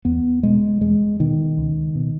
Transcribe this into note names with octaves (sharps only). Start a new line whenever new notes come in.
E2 B3
B2 G#3
E2 G#3
B2 D#3
C#2
B2